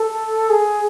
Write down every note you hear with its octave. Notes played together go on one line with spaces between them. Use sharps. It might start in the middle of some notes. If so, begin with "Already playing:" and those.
Already playing: A4
G#4